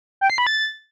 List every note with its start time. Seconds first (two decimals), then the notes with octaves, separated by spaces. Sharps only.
0.21 G5
0.30 C7
0.38 B5
0.47 A6